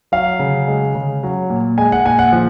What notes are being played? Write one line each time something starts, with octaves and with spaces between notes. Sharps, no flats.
F#3 F5
C#3
G#3
C#3
F#3
A#2
G#3 G#5
F#5
A#2 G#5
F#5
F3